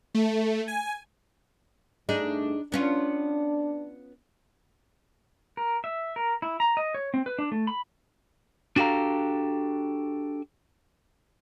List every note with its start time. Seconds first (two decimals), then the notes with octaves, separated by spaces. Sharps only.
0.15 A3
0.68 G#5
2.09 G2 A3 D4 D#4 G#4
2.72 B3 C#4 D4 F4
5.57 A#4
5.84 E5
6.16 A#4
6.42 E4
6.60 A#5
6.77 D#5
6.95 C#5
7.14 C4
7.26 B4
7.39 D4
7.52 A3
7.67 B5
8.76 D4 F#4 G4 A4 F5 A#5